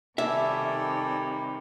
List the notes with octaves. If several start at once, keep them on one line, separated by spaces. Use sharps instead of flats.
C3 D#3 G3 A4 D5 E5 G#5